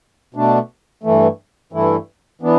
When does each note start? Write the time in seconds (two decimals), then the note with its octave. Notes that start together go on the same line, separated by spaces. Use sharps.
0.35 B2 A3 D4
1.03 G2 E3 A3
1.72 G2 E3 A3 E4
2.42 E3 B3 D4